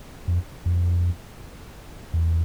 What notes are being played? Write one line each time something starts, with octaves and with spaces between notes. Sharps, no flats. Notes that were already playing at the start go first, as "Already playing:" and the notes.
F2
F2
E2